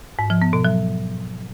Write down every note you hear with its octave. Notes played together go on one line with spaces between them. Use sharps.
G#2
F3
B3
B2
F#3